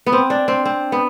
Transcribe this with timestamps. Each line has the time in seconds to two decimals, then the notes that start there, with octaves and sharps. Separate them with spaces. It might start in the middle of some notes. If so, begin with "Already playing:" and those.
0.06 B3
0.13 C4
0.30 D4
0.48 C4
0.65 C4
0.92 B3